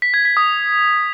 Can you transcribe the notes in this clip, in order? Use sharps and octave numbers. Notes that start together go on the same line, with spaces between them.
B6
G#6
B6
D#6